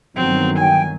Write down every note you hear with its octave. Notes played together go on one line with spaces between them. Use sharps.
G1 D#3 F#3 C4
G5 G#5